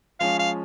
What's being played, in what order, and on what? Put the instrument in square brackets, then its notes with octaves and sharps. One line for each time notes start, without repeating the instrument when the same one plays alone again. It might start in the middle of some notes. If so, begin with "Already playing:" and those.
[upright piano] F3 G#3 C#4 [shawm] F5
[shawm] F5